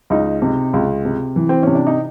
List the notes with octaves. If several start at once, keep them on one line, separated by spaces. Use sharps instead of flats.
C#2 D#4
C3
C#2
C3
E3
C4
C3 C#4
D4
D#4